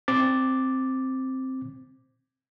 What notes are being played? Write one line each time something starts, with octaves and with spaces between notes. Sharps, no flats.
C4 D6 A6